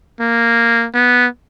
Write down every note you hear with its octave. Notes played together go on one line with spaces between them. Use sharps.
A#3
B3